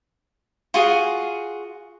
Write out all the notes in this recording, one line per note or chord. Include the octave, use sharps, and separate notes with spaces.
F4 F#4 G#4